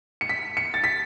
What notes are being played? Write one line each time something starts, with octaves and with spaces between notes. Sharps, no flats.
C#7
B6
C#7
A6
B6